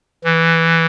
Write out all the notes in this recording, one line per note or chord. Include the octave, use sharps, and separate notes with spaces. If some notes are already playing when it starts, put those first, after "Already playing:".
E3